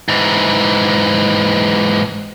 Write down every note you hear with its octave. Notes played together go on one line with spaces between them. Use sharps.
G#2 E3